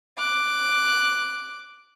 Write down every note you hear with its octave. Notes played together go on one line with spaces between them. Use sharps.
D6 F#6